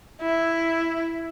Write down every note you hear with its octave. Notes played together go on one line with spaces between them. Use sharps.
E4